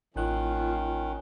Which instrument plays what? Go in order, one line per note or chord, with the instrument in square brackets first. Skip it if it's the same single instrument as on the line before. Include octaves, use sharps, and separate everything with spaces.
[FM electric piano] A1 F#6 [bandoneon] D#3 [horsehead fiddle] A#3 F4 [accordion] C#4